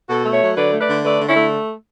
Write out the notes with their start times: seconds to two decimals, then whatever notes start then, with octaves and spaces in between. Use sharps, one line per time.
0.09 B2 F#4 A4
0.25 A3
0.33 C#5 E5
0.42 F#3
0.57 D3 B4 D5
0.73 A3
0.81 B4 D5
0.89 D3
1.05 A3 B4 D5
1.21 D3
1.29 C#4 E4
1.37 A3